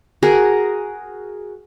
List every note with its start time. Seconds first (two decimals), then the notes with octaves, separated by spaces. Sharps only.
0.23 F#4 G#4 A#4